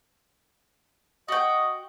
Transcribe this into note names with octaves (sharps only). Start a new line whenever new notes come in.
F#4 D#5 G5